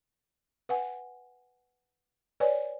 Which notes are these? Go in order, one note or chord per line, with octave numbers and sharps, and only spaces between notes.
B4 F#5 G#5
B4 C#5 D5 G#5